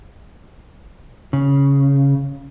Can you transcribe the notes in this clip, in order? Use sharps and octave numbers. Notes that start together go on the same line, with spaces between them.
C#3